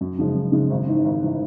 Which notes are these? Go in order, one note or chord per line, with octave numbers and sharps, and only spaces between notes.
F#2
C#3 F3 G#3
F#2
C#3 F3 G#3
G#1
G#2 E3
G#1
G#2 E3